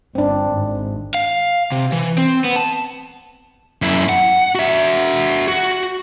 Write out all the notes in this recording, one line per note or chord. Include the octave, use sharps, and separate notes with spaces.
G1 C4 D4
G#1
F5
C3
E3
C4
B3
A5
F#2 E4
F#5
F#4 E5
F#4